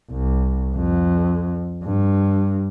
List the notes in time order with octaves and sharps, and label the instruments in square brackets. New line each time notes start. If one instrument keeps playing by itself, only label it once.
[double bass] C2
F2
G2